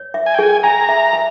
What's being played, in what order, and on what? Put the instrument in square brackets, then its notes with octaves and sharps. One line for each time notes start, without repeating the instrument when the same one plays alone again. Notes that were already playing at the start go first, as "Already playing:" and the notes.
Already playing: [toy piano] C#5
E5
[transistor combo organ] G#5
G5
[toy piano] G#4 [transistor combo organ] G#5
[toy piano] G#5 [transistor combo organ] A#5
[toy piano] E5
E5